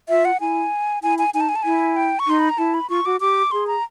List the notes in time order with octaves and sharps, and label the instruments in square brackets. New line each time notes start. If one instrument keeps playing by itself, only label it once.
[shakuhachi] F4 [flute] E5
[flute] F#5
[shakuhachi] E4 [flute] G#5
[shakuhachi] E4 [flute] G#5
[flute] G#5
[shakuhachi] D#4 [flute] G#5
[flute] A5
G#5
A5
[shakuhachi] E4 [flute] G#5
[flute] G5
C#6
[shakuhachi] D#4 [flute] C6
[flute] B5
A#5
[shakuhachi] E4 [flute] A5
[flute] B5
[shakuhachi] F4 [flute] C#6
[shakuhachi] F#4 [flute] D6
[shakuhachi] G4 [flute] D6
[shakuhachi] G#4 [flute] C6
[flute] A#5